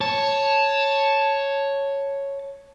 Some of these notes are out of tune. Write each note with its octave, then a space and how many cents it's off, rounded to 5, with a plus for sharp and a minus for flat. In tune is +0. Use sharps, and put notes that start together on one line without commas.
C#5 +0 A5 +0